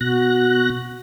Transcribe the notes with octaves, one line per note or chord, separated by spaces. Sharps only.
B2 F#4 F#6 A#6